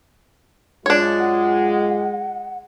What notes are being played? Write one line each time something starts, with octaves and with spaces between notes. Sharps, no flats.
F#2 G#3 D4 F4 C#5
F#5